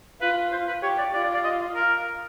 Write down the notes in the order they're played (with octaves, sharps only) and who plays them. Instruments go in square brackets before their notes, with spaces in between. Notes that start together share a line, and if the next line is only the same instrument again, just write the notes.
[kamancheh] F4 [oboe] B4
[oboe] C5
B4
[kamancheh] G4 [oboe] C#5
[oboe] D5
[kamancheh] F4 [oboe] D5
[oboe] D5
D5
D#5
A#4